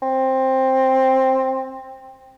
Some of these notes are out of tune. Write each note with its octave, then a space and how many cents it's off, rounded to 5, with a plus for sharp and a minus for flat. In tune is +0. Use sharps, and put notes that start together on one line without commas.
C4 +10